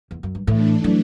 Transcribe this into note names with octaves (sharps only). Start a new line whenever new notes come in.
E2
F#2
G2
A2 E3 A3 D4
F#3